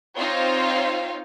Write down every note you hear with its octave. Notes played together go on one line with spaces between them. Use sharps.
C4 D#4 F4 C5 C#5 F5